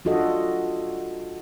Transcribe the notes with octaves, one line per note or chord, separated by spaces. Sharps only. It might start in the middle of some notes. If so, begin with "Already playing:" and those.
D4 F4 F#4 A4 D#5